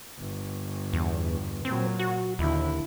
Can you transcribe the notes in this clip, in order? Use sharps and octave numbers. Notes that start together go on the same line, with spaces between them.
G1
E2
A#2 F#3 C4
F#4
D#2 D3 E4